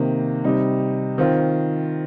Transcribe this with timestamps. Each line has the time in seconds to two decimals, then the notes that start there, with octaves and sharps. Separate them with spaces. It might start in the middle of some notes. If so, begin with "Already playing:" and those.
Already playing: C3 D#3 A#3
0.44 C3 G3 D#4
1.18 D#3 C4 F4